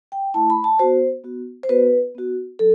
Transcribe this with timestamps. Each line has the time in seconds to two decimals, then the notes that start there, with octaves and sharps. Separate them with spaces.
0.12 G5
0.34 A3 E4 A5
0.50 B5
0.64 A5
0.79 B3 F#4 C5
1.24 B3 F#4
1.63 C5
1.69 B3 F#4 B4
2.15 B3 F#4
2.59 F#3 A4